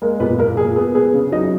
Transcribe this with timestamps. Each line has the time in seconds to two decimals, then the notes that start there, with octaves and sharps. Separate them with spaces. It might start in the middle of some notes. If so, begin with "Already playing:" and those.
0.02 G#3 A#3 A#4
0.20 A#2 B3 B4
0.38 A#2 A#3 A#4
0.57 A#2 G#4
0.76 B3 G#4
0.95 B3 G#4
1.14 C#3
1.32 F#3 D#4 D#5